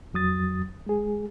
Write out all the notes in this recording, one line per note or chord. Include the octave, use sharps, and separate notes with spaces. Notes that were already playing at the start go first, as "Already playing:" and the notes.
F2 F#3 D#6 A6
G#3 G#4